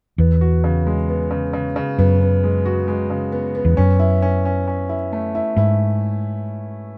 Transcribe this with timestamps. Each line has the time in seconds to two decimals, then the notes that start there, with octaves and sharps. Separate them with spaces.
0.18 E2 B3
0.41 F#4
0.64 C#3
0.87 G#3
1.09 B3
1.31 C#3
1.53 C#3
1.76 C#3
1.98 F#2 B3
2.21 B3
2.44 G#3
2.66 F#4
2.88 G#3
3.10 C#3
3.32 B3
3.55 B3
3.65 E2
3.77 F#2 C#4
3.99 E4
4.22 C#4
4.45 C#4
4.68 C#4
4.89 E4
5.13 A3
5.35 E4
5.57 G#2 E4